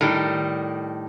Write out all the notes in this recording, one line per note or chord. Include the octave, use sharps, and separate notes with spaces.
A2 D#3 G3